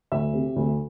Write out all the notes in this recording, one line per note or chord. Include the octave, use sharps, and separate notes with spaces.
D2 E5
C3
D2